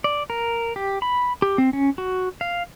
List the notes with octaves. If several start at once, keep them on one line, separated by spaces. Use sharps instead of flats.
D5
A#4
G4
B5
G4
C4
C#4
F#4
F5